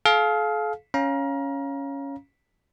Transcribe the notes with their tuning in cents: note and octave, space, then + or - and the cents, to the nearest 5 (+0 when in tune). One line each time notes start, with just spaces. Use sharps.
A4 -45 F5 +5
C#4 +0 F5 +0 A#5 +30